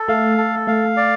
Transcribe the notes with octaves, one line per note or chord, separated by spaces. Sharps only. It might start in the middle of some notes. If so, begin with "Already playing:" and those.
Already playing: A4
A3 F5
A4
A3 F5
D5